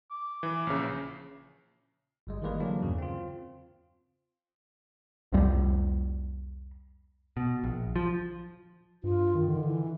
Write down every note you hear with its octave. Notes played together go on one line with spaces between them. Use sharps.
D6
E3
A#1 C#3
G1 G3 G#3
D#3 E3 G3 G#3 A#3 B4
D3 E3 F#3 A#3 D4
E2 G2 C#3
C4 F4
C2 F2 G3
B2
A#1
F3
G2 F4
D#3
D3 D#3
E3